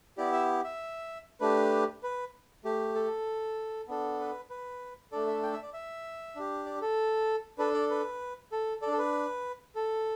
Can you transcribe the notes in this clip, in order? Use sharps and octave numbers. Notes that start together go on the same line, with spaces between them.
B3 E4 G4 D5
E5
E5
A3 D4 G4 B4
B4
A3 G4
A4
B3 D4 A4
B4
B4
A3 D4 A4 D5
E5
G5
E5
D5
E5
D4 G4
D5
A4
D4 A4 B4
D5
B4
A4
A4 D5
D4
A4
B4
A4